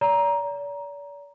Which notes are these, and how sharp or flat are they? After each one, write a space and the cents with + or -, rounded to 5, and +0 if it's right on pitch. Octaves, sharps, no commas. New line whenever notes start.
D5 -40 A#5 +15